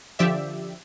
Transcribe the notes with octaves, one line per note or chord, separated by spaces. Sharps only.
D3 F3 G4 D5 E5